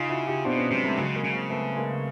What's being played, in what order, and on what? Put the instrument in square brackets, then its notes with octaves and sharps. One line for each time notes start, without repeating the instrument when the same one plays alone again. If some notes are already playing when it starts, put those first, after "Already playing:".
Already playing: [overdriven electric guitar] C#3 [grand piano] D#4 F4
[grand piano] E4 F#4
F4 G4
[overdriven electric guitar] B2 [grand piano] C4 D4
[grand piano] B3 C#4
[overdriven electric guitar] C3 [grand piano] F#3 G#3
[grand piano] G3 A3
[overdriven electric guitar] C#3 [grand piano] F#3 G#3
[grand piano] G#3 A#3
[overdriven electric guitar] C#3
[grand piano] A#3 C4
A3 B3
G#3 A#3